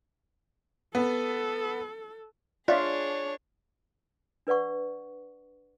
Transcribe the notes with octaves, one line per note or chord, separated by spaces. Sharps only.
B3 A4
D4 F4 G#4 C#5 D5 E5
D4 B4 D5 F#5 C#6